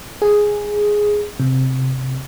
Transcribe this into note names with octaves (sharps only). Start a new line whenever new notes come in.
G#4
C3